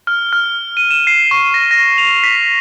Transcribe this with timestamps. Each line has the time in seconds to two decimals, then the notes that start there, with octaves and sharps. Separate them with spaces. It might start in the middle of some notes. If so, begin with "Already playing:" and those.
0.07 F6
0.33 F6
0.77 D#7
0.91 E7
1.07 C7
1.31 C#6
1.54 A#6
1.71 A#6
1.98 F7
2.24 B6